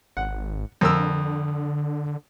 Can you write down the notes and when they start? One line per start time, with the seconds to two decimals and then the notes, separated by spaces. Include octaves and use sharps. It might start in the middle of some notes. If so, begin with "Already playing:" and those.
0.17 G#1 F#5
0.81 F2 D3 A#4 E6